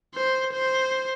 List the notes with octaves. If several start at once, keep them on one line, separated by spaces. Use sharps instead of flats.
C5
C5